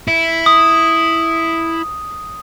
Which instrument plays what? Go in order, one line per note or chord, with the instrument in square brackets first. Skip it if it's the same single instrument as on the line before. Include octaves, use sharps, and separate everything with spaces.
[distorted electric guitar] E4
[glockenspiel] D#6